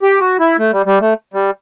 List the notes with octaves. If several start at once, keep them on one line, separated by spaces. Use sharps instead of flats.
G4
F#4
E4
A3
G3
G3
A3
G3